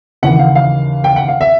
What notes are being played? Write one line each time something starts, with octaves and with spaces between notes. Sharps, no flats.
D#2 C#3 E3 F#5
F5
F5
G5
F#5
F5
E5